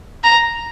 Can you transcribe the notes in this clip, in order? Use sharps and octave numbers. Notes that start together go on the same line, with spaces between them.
A#5